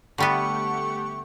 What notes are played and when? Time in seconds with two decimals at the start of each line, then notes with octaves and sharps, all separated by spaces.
0.18 D3 G3 A3 B3 G4 F#5 C#6